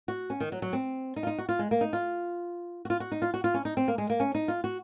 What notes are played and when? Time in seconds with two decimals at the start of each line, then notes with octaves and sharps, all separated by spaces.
0.08 F#4
0.30 C#4
0.40 D#3
0.52 F#3
0.62 F#3
0.73 C4
1.16 D#4
1.23 F4
1.27 D#4
1.38 F#4
1.49 F4
1.59 G#3
1.71 A#3
1.81 D#4
1.93 F4
2.85 F#4
2.90 F4
3.00 F#4
3.11 D#4
3.22 F4
3.34 F#4
3.44 F4
3.54 C#4
3.65 D#4
3.77 C4
3.88 A#3
3.98 G#3
4.10 A#3
4.20 C#4
4.35 D#4
4.48 F4
4.64 F#4